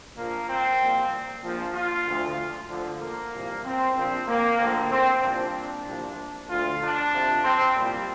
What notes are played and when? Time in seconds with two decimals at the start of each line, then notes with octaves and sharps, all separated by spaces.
0.16 A#1 A#2 F3 A#3
0.48 C4
0.79 C2 A#2 F3
1.42 A#1 A#2 F3
1.74 F4
2.06 D2 D3 F3
2.69 D2 D3 F3
3.01 A#3
3.32 C2 A#2 F3
3.64 C4
3.95 A#1 A#2 F3 C4
4.27 A#3
4.59 D2 D3 F3 C4
4.90 C4
5.22 C2 A#2 F3 D4
5.85 C2 A#2 F3
6.48 D2 D3 F3 F4
6.80 D4
7.12 F2 C3 F3
7.43 C4
7.75 C2 A#2 F3 G3